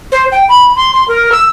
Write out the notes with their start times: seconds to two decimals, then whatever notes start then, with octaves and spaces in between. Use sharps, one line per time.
0.12 C5
0.32 G5
0.49 B5
0.76 C6
0.94 C6
1.08 A#4
1.32 E6